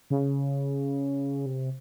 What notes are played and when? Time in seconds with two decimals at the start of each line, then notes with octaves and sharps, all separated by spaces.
0.10 C#3
1.46 C3